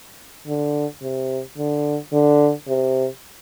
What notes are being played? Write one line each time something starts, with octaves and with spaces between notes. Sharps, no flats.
D3
C3
D3
D3
C3